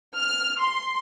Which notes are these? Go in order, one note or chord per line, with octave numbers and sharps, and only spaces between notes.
F6
C6